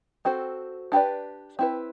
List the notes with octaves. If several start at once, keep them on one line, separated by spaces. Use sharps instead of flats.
C4 F#4 A4 C5
D4 G4 B4 D5
C4 E4 B4